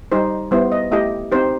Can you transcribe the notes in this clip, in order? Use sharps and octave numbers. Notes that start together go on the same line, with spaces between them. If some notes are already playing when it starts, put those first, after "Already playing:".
G3 D#4 G4 C5
G3 B3 E4 G4 C5
D#5
A3 E4 G4 D#5
C4 D#4 G4 C5